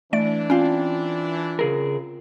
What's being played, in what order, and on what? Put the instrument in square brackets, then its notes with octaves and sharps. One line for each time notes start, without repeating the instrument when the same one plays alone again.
[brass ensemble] E3 D4 [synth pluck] A3 D5 D7
[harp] C4 F4 [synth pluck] C#4
[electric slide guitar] C#3 G#4 A#4